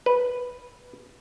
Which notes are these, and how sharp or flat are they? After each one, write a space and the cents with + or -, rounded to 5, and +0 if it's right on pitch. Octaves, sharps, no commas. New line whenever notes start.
B4 -5